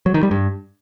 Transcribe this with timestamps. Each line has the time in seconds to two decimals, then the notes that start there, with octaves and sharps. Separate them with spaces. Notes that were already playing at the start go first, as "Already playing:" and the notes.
0.06 F#3
0.14 D#3
0.23 G3
0.31 G2